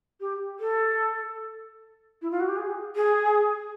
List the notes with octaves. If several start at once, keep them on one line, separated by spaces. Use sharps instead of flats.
G4
A4
E4
F4
F#4
G4
G#4
G#4